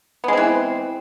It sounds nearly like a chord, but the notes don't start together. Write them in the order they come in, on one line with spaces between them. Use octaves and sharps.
B3 G#3 C4 E3